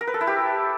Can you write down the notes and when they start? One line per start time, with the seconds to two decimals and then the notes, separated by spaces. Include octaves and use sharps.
0.01 A#4
0.07 B4
0.14 A4
0.21 E4
0.27 G4